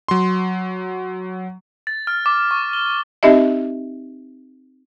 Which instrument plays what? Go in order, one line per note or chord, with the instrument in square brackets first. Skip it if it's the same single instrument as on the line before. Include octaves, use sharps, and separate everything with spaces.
[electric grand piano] F#3 C6
[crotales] A6
F6
D6
C#6
G7
[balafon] C4 D#4 G4 D#5 E5